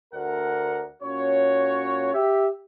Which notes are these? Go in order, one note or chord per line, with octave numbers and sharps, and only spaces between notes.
D2 A#4 F#5
A#2 C#4 F#4 C#5
G4 E5